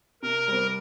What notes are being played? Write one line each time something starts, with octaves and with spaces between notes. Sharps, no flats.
C3 A#4
G3 C4